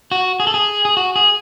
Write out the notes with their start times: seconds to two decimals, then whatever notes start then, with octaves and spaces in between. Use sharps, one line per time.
0.11 F#4
0.40 G#4
0.47 A4
0.54 G#4
0.85 G#4
0.97 F#4
1.16 G#4